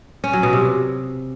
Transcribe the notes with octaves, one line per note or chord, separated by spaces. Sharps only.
C#4
F#3
B2
C3